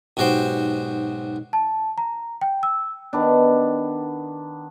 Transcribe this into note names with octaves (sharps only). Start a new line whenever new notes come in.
B1 G#2 F#4 G4 C5 G5
A5
A#5
G5
E6
D#3 B3 D4